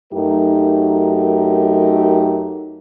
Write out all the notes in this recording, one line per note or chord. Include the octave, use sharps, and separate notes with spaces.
F#2 F#3 A3 D#4 G4 A#4